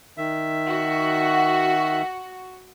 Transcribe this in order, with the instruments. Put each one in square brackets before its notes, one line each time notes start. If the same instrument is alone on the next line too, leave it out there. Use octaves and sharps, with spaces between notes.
[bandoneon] D#3 E5
[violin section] F#4